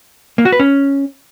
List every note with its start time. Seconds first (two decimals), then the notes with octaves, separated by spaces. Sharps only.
0.38 A#3
0.45 F#4
0.52 B4
0.60 C#4